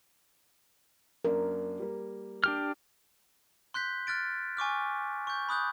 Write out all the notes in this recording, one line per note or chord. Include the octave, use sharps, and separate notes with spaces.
F#2 A#3 D4 A#4
G3 A#3
D4 G4 F6
C6 F#6 G6 B6
F6 F#6 A6 D7
G#5 C#6 D6 F6
C#6 G6
B5 D#6 F#6 G6